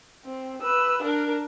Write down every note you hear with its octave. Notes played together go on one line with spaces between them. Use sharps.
C4
B4 E6
D4 A#4